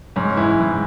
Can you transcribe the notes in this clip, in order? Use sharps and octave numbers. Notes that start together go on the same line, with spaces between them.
G#2 C#4
E3 E4
G#2